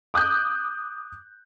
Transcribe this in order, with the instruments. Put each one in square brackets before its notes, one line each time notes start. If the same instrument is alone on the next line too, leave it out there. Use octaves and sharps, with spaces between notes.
[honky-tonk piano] D6 D#6 F#6 G6